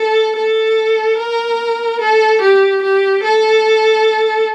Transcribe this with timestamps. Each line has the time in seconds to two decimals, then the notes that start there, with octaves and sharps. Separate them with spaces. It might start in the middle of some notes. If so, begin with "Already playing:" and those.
Already playing: A4
0.36 A4
1.19 A#4
2.01 A4
2.42 G4
2.83 G4
3.24 A4